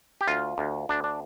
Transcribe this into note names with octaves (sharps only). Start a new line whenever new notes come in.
G4
D2 F4
D2
D2 D4
D4